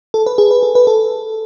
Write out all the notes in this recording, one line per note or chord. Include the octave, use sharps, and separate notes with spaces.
A4
B4
G#4
B4
A4
B4
A4